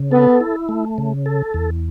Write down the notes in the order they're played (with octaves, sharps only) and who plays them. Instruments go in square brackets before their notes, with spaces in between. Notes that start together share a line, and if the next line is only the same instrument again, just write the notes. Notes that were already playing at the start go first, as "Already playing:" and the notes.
Already playing: [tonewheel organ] C#3
[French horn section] B3 [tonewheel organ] A4
[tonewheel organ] E4
A3
C#3
A4
E2